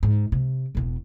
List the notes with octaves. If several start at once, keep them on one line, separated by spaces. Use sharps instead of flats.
G#2
C3
E1 B2